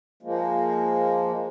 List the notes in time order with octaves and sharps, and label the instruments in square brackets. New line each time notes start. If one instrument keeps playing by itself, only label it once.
[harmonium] F3 G#3 A#3